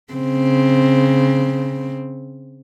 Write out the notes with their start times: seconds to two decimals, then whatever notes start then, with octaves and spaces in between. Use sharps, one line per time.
0.13 C#3 C4